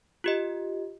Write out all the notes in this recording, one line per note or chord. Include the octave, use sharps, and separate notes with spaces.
F4 G4 D#5